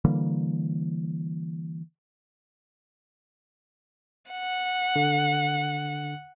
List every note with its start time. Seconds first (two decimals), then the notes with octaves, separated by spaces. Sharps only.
0.05 D3 E3 G3 A#3
4.32 F#5
4.96 D3